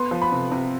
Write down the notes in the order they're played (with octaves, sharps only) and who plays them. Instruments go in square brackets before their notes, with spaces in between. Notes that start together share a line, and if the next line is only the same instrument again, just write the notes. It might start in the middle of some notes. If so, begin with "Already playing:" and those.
Already playing: [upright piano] B3 C6
F3
B5
C3
C3